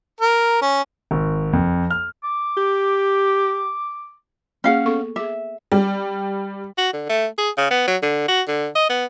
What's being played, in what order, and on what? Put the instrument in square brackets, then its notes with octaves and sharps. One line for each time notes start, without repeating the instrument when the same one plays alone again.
[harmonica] A#4
C#4
[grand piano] G#1
F2
F6
[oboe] D6
[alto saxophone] G4
[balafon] A#3 G#4 [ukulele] C#4 F5 F#5
[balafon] B3 A4 C#6
[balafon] G#4 D6 [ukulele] E5
[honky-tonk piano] G3
[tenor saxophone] F#4
D3
A3
G#4
C#3
B3
F#3
D3
F#4
D3
D#5
B3